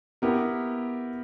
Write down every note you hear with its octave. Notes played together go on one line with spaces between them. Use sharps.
B3 E4 G4 A#4